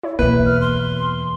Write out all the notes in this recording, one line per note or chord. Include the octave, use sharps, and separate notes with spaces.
E4 C#5
E2 B2 A#3 B4 E5
F6
C6